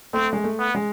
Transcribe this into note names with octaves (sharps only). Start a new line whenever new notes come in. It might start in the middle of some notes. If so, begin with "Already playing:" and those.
A3 C4
G#3
A3
B3
G#3